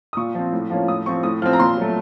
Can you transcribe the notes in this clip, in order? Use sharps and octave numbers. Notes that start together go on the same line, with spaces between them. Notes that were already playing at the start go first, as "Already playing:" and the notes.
D#6
A#2 C#6
F3 C4
A2
F3 A#3 C#4
A2 D#6
F3 C4 C#6
A2 D#6
F3 C4 F6
A#5
A#2 C6
F#3 A3